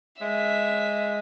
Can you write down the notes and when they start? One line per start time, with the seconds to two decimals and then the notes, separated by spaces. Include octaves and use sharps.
0.21 G#3 E5